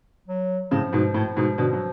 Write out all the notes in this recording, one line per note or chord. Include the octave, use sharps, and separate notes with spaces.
F#3
A2 C#3 F3
G#2 B2
A2
G#2 B2
B2 D3
F#3